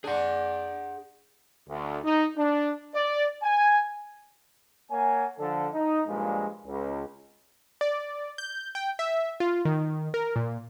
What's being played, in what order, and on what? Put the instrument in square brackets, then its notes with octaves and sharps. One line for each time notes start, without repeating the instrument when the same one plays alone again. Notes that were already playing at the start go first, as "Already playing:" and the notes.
[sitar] D4 [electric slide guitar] G#4 F#5
[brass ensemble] D2
D#4
D4
D5
G#5
A#3 C#5 F#5 G#5
D3 F3 A4
D#4
G2 A#2 F3 G#3
C#2
[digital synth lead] D5
G6
G5
E5
F4
D#3
A#4
A#2